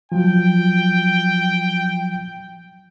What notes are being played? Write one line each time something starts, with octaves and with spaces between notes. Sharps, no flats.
F3 F#3 G5